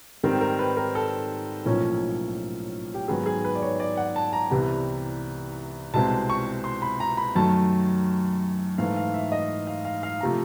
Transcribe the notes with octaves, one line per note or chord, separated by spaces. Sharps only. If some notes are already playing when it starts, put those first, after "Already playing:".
G#2 D#3 G3 C4 A#4
A#4
B4
A#4
A4
B1 A2 F3 A#3 C#4
G4
G#2 D#3 F#3 B3 G#4
G#4
B4
D5
C#5
D5
F#5
A5
A#5
C2 C3 E3 G3 B3
C2 B2 G#3 C4 A5
C#6
C6
B5
A#5
B5
F#2 D#3 F#3 A3 A5
G#2 E3 A3 F5
F5
E5
D#5
F5
F5
F5
C3 F3 A3 A#5